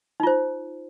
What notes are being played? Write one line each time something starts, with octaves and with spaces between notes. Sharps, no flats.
D#4 F4 C5